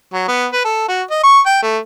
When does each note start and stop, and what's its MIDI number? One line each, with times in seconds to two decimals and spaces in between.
0.13 0.25 54
0.28 0.47 59
0.52 0.64 71
0.64 0.84 69
0.88 1.02 66
1.11 1.19 75
1.23 1.39 85
1.46 1.60 79
1.62 1.78 57